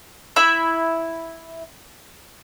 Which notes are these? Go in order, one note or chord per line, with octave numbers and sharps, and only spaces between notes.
E4 E5 B5